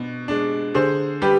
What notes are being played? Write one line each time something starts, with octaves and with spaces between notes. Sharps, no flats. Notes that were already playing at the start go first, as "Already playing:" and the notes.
Already playing: B2 D4
G#3 D4
D3 G#4 C5
G3 G4 B4